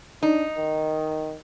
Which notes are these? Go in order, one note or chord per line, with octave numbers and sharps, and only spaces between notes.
D4 D#4
D#3